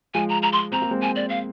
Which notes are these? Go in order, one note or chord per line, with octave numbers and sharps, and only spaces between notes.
F3 G#3 G#5
A#5
A#5
C6
C4 A#5
A#3
G#3 C4
G#5
D5
F5